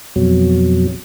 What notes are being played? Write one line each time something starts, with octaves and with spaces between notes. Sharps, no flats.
F2 B2 F#3